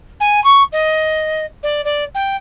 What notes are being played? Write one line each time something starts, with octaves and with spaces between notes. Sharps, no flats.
G#5
C#6
D#5
D5
D5
G5